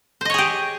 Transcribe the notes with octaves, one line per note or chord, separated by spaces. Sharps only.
G4 G#4 C5 C#5 D#5